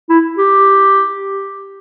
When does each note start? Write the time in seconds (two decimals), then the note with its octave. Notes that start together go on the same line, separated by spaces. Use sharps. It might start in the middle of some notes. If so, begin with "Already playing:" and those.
0.09 E4
0.38 G4